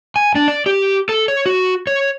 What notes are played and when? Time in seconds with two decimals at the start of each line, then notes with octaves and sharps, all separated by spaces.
0.16 G#5
0.35 D4
0.48 D5
0.66 G4
1.09 A4
1.28 C#5
1.46 F#4
1.87 C#5